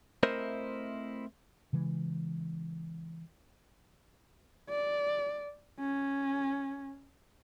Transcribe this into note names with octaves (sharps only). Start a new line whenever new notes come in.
A3 C4 E4 A#4 C5 D#5
C#3 E3 G#3
D5
C#4